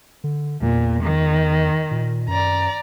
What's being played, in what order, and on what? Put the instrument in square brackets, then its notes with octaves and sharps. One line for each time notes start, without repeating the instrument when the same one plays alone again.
[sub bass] D3
[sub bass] E2 [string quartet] A#2
[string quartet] D#3
[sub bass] A#2
[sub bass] F#2 [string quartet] D5 A#5